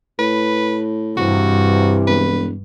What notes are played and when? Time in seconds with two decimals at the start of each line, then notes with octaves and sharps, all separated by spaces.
0.19 A2 B4
1.17 G2 C3 E3 F#4
2.07 E1 B4